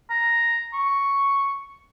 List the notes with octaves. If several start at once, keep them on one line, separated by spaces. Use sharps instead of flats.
A#5
C#6